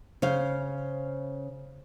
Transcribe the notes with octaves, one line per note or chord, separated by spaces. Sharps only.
C#3 C5 F5